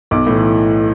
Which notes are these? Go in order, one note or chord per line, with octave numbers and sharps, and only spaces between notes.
B1 D6
A2 E3